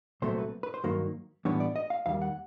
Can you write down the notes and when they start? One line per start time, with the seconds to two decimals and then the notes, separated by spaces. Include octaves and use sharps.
0.22 C2 A#2 F#3 A3 C4 C5
0.38 B4
0.63 B4
0.74 C5
0.84 G2 D#3 F#3 A#3
1.45 A2 E3 G3 B3 D4 C#5
1.60 D5
1.76 D#5
1.90 F5
2.06 D#2 D#3 G3 F5
2.22 F#5